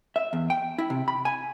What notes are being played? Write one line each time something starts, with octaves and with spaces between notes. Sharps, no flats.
E5
E2
G5
E4
C3
B5
G#5